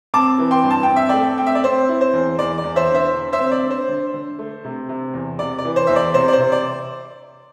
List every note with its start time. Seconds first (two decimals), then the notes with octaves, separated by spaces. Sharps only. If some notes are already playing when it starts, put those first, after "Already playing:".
0.14 C4 A5 D6
0.38 E3
0.51 G5 C6
0.63 G2
0.71 A5
0.83 C4 G5
0.96 E5
1.09 A3 D5 G5
1.38 C4 G5
1.47 E5
1.55 D5
1.64 C4 C5
1.89 E4
2.01 C5
2.13 E2
2.39 E2 D5
2.58 D5
2.64 E2
2.76 C5 E5
2.89 D3
2.95 C5 E5
3.14 D3
3.33 C5 E5
3.39 C4
3.52 D5
3.63 D3
3.71 C5
3.89 D3
4.14 D3
4.39 A3
4.65 C3
4.89 C3
5.14 E2
5.39 C3 D5
5.58 D5
5.65 E3
5.76 C5
5.87 E2 E5
5.96 D5
6.14 C3 C5
6.28 D5
6.33 C5
6.39 C3
6.52 D5